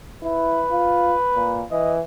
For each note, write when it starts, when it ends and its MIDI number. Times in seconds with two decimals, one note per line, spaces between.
0.23 0.64 64
0.23 1.66 71
0.71 1.14 65
1.36 1.64 46
1.71 2.00 52
1.71 1.95 75